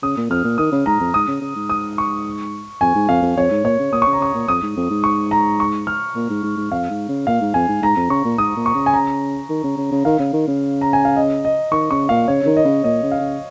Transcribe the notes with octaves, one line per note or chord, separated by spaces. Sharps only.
C#3 D#6
A#2
F2 F6
A#2
D#3 D#6
C#3
G#2 A#5
F2
G#2 D#6
C#3
C#3
G#2
D#6
C#6
F2 G#5
G#2
F2 F5
F2
F2 C#5
G#2
A#2 C#5
C#3
A#2 D#6
C#3 C#6
A#5
C#3 C#6
A#2
F2 D#6
G#2
F2
G#2
C#6
A#5
C#6
F6
A#2
G#2
G#2
G#2
F2 F5
G#2
C#3
A#2 F5
G#2
F2 G#5
G#2
G#2 A#5
F2
C#3 C#6
A#2
G#2 D#6
A#2
C#6
C#3
G#5
A#5
D#3
C#3
C#3
C#3
D#3 F5
C#3
D#3
C#3
A#5
G#5
F5
D#5
D#5
D#3 C#6
C#3 C#6
A#2 F5
C#3 C#5
C#3
D#3
D#5
C#3
A#2 D#5
C#3
F5
C#3